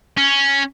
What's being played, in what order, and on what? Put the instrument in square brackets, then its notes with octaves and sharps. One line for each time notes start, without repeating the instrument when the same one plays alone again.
[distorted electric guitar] C#4